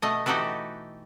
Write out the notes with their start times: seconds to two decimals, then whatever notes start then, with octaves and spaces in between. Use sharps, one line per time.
0.02 B2 A3 D#5
0.26 E3 D#4 F#4 G4 A4 B4